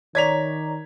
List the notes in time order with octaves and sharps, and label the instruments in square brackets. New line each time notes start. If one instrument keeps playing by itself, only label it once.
[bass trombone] D#3 [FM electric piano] C#5 D5 A#5 [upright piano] G#6 B6 F7